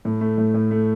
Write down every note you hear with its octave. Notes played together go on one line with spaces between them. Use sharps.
A2
A3
A2
A2
A3